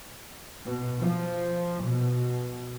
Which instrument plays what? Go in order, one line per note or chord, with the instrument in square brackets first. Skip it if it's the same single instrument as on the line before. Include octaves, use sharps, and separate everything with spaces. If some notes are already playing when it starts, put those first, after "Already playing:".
[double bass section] B2
F3
B2